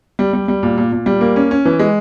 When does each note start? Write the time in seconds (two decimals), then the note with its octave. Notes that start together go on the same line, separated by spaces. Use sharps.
0.19 G3
0.33 G3
0.48 G3
0.63 A#2
0.78 A#2
0.92 A#2
1.06 G3
1.21 A#3
1.36 C#4
1.51 C#4
1.65 E3
1.79 G#3